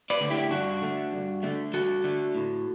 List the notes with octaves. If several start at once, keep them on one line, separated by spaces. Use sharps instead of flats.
B4 D5
D3 A3
E4 G4
G2 D4 F#4
D3 A3
G2
D3 A3
G2 F#4 A4
D3 A3
A2